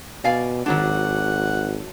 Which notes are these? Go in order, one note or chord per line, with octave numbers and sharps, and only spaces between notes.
B2 D5 F5 G#5
G#1 D#3 F#3 D4 F#5